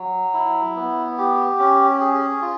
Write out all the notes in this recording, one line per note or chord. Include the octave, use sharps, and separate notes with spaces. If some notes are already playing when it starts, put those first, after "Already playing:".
Already playing: F#3
E4
B3
G4
C#4
G#4
F4